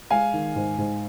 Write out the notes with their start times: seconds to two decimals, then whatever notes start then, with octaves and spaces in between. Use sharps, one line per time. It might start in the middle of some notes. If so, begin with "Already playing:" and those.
0.10 G#3 F5 G#5
0.33 D#3
0.56 G#2
0.78 G#2